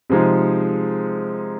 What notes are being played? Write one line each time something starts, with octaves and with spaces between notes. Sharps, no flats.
C3 F3 G#3 D#4 G#4